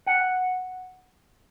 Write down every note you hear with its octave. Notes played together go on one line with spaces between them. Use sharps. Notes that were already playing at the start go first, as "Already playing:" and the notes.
F#5